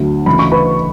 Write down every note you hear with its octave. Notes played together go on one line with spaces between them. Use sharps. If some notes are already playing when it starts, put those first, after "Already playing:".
Already playing: D2 D3 F#3
D2 C#3 E3 B5
C#6
B4 B5